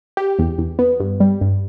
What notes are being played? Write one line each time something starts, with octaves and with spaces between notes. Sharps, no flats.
G4
E2
E2
B3
G2
G3
G2